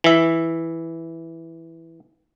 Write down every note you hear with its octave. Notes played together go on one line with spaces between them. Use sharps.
E3 E5